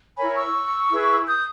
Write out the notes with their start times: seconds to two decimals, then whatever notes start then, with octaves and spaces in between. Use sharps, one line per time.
0.17 E4 A#4 C#5 G#5 B5
0.35 C#6 E6
0.91 E4 G#4 B4
1.27 D#6 G6